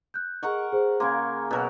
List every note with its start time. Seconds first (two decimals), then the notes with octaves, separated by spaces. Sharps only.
0.14 F#6 G6
0.43 G#4 A#4 D#5 F#5 C#6
0.72 G#4 C5
1.00 C#3 A#3 C6 G#6
1.51 B2 F#3 A#4